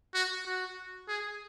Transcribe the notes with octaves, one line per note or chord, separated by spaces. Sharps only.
F#4
F#4
G#4